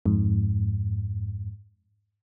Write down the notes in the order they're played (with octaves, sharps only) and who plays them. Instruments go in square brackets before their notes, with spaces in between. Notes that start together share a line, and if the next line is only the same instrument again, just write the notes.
[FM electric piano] F2 G#2